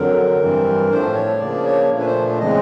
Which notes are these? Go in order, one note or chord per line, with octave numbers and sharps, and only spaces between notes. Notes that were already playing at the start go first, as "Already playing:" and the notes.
Already playing: F2 D3 F#3 A#4
G2 E3 G3 C4
A2 F3 A3 D4 C5
C#5
C#3 F3 A#3 D4 D5
C#5
A#2 F3 A3 D4
B4
C5
C#3 E3 G#3 C4 D#5